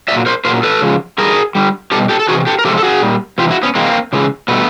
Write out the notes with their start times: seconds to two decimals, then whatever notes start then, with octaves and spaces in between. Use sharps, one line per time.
0.08 A#2 F#3 D5 E5
0.26 A#4 C5
0.45 A#2 A#4 C5
0.48 F#3
0.63 A4 B4
0.82 C#3 F3 G#3
1.18 D3 G3 G#4 A#4
1.55 D3 G3
1.92 B2 G3 G4 A4
2.09 G4 A4
2.19 A4
2.28 C3 E3 F#4 G#4
2.47 G4 A4
2.59 A#4
2.65 C3 F3 G#3 G4 A4
2.78 A4
2.83 F#4 G#4
3.02 A#2 G3
3.38 C3 E3 F4 G4
3.51 E4 F#4
3.63 B3 C#4
3.75 C3 E3 G#3 A#3 C4
4.13 C#3 E3 G#3
4.48 B2 G3 A3 B3